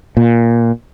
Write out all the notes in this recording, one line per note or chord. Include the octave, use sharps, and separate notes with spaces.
A#2